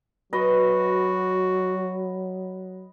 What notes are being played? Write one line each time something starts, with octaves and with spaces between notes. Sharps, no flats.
F#3 F#4 B4 D#5